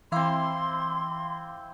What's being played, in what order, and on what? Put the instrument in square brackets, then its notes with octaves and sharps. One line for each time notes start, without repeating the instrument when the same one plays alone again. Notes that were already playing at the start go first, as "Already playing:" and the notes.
[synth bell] E3 F5 D6 [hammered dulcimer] C4 E4 [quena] C6